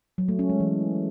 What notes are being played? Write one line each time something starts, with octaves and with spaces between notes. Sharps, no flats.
F#3
A3
C#4
G#3
E3